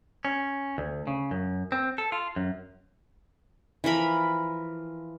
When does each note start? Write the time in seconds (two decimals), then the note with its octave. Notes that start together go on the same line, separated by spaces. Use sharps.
0.25 C#4
0.78 D2
1.07 C#3
1.31 F#2
1.72 C4
1.98 A4
2.12 F4
2.36 F#2
3.84 E3 F3 A#4 B5